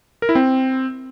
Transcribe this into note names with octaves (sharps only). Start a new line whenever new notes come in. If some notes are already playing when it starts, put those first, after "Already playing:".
A#4
E4
C4